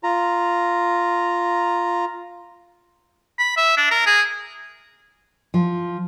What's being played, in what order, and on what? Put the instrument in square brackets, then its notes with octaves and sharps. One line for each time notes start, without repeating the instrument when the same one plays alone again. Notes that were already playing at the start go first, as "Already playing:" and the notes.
[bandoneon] F4 A#5
[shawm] B5
E5
D4
A#4
G#4
[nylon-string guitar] F3